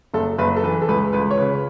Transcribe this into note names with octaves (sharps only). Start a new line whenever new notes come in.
F#1 A4
F#1 B4
A4
E3 B4
A4
C#2 B4
C#2 B4
C#5
C#3 B4